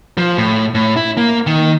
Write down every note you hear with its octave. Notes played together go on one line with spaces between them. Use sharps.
F3
A2
A2
E4
A#3
D#3